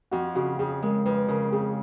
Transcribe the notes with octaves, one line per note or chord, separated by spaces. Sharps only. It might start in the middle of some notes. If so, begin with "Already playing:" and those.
F2 F#4
C#3 F#4
F2 G#4
G#3 A#4
F2 B4
C#3 A#4
F2 G#4